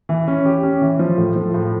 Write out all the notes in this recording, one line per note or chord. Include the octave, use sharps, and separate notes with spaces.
E3
C#4
G4
C#4
E3
F3
A2
F3
A2